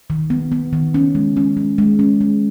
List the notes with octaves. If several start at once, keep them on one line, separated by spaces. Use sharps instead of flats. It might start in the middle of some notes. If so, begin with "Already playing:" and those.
D#3
B3
B3
D#3
C#4
G#3
C#4
G#3
G#3
C#4
G#3